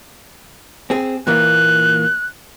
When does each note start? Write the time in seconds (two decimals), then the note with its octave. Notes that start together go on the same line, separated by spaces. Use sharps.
0.90 C4 G#4
1.27 A#2 E3 A#3 F#6